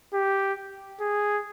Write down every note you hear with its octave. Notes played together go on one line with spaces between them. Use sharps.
G4
G#4